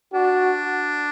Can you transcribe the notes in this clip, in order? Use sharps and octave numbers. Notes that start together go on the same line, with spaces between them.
D4 F#4